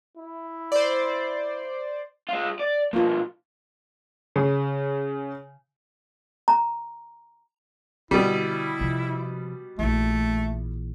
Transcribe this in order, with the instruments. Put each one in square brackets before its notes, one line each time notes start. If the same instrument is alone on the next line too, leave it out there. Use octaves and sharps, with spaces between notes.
[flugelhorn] E4
[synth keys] C5 D5
[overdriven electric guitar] G#3 F4
D5
[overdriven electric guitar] B2 F3 [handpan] A#3 F4
[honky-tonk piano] C#3
[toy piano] A#5
[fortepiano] B2 G3 [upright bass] D3 [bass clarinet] E4
[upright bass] C3 F3
[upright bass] A#1 E3 [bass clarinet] A3